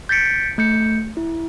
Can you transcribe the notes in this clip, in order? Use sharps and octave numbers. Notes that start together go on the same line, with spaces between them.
G6 A6 B6 C#7 D7
A3 G6 C#7
E4